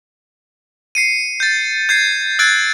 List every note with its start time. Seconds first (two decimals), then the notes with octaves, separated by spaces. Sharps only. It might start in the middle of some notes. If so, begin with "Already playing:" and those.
0.95 C7 C#7 D#7
1.40 G6 A6
1.89 G6 G#6 C7
2.39 E6 F#6 G#6 A6 D7